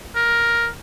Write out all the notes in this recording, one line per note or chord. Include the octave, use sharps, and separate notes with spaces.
A#4